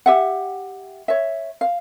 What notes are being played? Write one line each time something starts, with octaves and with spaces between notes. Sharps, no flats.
G4 E5 F#5
C#5 E5
F5